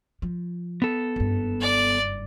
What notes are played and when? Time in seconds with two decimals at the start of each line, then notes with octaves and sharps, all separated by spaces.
0.22 F3
0.82 B3 A4
1.16 F#1 G2
1.61 D5